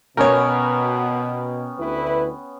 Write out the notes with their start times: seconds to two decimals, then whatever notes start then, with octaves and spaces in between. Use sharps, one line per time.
0.17 B2 B3 C#4 A#4 C#5 G5
1.79 D2 E4 B4